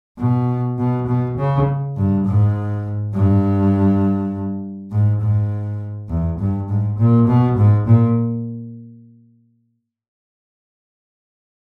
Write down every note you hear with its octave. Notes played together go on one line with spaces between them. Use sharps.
B2
B2
B2
C#3
G2
G#2
G2
G#2
G#2
E2
G2
G#2
A#2
B2
G#2
A#2